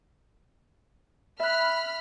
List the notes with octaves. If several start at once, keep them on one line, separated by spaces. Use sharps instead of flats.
E5 B5 F6 F#6